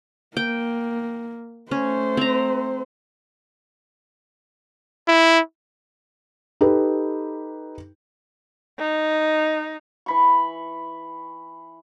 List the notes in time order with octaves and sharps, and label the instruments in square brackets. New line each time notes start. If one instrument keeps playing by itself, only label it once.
[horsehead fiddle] A#3 [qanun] G5
[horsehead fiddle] A3 C5 [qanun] C#4
[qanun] C4 A#5
[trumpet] E4
[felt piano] D#4 G4 A4 B4
[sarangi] D#4
[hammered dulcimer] E3 B5 C#6